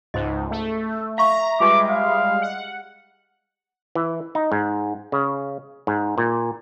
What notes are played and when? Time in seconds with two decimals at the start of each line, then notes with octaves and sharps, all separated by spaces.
0.14 C#2 G#2 C5 D#5
0.51 A3
1.18 E5 F5 A#5 C#6
1.60 G3 G#3 F4 G4 B4 D6
1.90 F5
2.41 F#5
3.95 E3
4.35 D#4
4.52 G#2
5.12 C#3
5.87 G#2
6.18 A#2